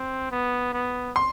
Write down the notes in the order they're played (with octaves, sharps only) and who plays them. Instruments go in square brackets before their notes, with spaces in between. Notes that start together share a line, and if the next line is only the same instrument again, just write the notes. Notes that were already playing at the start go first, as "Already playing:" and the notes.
Already playing: [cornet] C4
B3
B3
[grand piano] C6